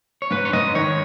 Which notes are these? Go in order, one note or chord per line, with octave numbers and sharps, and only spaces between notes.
C#5
G#2 B4
C#5
G#2 D#5
D#3 C#5